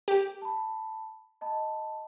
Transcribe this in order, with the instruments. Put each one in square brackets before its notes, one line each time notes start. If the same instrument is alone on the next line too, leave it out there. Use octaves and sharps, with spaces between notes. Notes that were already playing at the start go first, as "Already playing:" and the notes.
[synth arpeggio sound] G4
[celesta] A5 B5
D#5 A5 B5